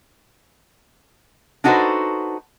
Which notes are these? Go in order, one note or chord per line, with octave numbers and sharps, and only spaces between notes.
D4 D#4 F#4 A4 B4 C5